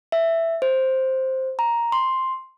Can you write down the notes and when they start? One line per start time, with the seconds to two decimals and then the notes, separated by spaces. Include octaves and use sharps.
0.12 E5
0.62 C5
1.59 A#5
1.92 C6